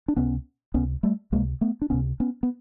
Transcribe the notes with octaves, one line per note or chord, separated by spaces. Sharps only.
D4
C#2 C3 B3 C#4
C#2 C3 B3 C#4
G3 A3
C#2 C3 G#3 A#3
A3 B3
D4
C#2 C3 B3 C#4
B3 C#4
B3